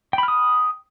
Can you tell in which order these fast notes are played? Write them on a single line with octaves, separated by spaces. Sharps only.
G5 B5 F6 D#6